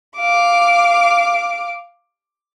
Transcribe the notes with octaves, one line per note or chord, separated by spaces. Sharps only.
F5 D6